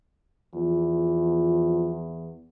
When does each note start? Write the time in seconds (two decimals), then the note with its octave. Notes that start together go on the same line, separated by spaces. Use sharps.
0.55 E2 F3